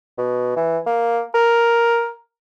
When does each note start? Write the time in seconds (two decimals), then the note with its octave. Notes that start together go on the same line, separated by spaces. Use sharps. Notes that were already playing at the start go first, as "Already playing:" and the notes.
0.18 B2
0.57 E3
0.86 A#3
1.34 A#4